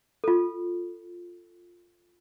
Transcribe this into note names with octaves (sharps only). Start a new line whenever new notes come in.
F4 A4